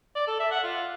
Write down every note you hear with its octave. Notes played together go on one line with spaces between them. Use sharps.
D5
A4
E5
F#5
F4